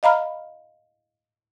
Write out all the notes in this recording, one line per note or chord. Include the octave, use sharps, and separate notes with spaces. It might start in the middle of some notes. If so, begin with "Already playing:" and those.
D#5 F5 A#5 B5 F6